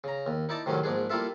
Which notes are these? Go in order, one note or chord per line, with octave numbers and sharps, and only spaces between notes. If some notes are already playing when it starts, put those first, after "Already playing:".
C#3 A#5
D#2
D#4 E4 D5 A5
A2 C3 D#3 F#3 G3 C#4
A#1 G#2 D4 G#4
G3 A#3 E4 F4 A4 E5